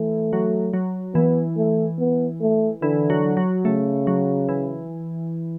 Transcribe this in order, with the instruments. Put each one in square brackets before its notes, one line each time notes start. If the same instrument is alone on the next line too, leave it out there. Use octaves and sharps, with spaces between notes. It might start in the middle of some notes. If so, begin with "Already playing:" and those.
Already playing: [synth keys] E3 [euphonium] A3
[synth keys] F#3
F#3
[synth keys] E3 [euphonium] B3
[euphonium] A3
B3
A3
[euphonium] D3 [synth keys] E3
[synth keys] F#3
F#3
[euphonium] C#3 [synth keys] A3
[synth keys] F#3
E3